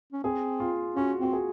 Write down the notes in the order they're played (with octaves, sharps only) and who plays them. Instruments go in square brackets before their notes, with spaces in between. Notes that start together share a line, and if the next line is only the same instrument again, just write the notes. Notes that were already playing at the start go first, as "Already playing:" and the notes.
[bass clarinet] C#4
[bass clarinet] C4 [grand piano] G#4
[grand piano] F4
[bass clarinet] C#4 [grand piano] F#4
[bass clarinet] C4 [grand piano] F#4
[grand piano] G#4